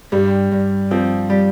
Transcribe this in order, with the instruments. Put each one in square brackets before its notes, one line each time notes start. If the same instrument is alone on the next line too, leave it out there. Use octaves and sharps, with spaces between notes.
[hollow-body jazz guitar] G2 [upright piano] G3
[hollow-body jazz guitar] G2
[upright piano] F3 [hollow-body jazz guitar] C4
[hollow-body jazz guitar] G3